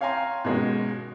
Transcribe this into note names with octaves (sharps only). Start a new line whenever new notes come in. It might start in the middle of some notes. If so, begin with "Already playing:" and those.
C#5 F5 G5 G#5 A#5 C6
B2 D#3 G#3 C#4 F#4